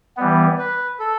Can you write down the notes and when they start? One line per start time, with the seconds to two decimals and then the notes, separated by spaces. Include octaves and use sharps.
0.17 E3 G3 B3
0.58 B4
1.00 A4